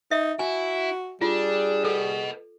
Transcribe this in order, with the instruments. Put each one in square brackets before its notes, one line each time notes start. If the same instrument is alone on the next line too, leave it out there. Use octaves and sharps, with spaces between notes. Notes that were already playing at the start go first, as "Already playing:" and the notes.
[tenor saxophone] D#4 [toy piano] E5
[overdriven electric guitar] E4 [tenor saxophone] F#4 [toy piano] G#5
[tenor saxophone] G3 [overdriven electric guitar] D4 [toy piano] F4 [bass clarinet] G#4
[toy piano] A4 [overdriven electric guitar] B4 D#5